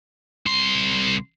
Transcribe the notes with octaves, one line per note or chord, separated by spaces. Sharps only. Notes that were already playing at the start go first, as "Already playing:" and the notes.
C2 C6